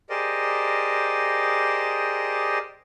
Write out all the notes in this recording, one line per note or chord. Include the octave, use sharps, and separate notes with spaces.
G4 G#4 A#4 C5 D5 D#5